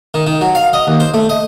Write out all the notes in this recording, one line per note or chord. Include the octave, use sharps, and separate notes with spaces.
D#3
D#3
F#3
F5
D#5
D#2
C5
A3
D#5